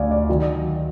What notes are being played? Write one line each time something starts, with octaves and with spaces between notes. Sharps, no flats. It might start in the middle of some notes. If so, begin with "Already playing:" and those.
Already playing: D2 D5 F5 G#5
D5
D#3 F#3